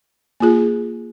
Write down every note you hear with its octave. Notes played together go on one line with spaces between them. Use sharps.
A#3 F4 G#4